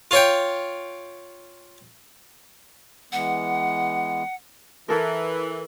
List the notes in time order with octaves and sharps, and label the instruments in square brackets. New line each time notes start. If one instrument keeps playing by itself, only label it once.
[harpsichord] F4 C#5 G5
[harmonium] E3 G#3 B3 [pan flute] F#5
[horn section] E3 [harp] E4 A4 A#4